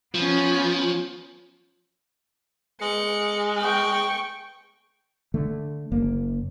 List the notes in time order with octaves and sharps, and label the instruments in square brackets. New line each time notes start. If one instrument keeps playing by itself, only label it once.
[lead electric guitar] F3 [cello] B3 C#4
[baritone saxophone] G#3 [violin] C#7
[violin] G5 C#6
[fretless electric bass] D3 A3
F#1 A#3